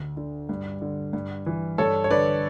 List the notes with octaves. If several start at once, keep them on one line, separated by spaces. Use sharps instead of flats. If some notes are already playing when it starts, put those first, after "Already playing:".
Already playing: D2
D3
G2
D3
G2
E3
G2 A4 C#5
C#5
D3 B4 D5